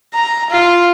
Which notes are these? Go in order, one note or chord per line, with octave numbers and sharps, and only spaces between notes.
A#5
F4